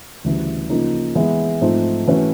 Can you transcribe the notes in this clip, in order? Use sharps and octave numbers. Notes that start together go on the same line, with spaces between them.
D2 C#3 E3 G3
C#3 F3 A#3 D#4
E3 G#3 B3 E4
G#2 F3 A3 C4 D#4
E3 A3 C#4 F#4 B4